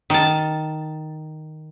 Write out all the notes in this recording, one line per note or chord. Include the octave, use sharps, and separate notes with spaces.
D#3 A5